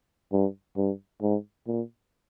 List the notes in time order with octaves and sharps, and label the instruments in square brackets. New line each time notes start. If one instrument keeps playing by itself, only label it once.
[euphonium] G2
G2
G#2
A#2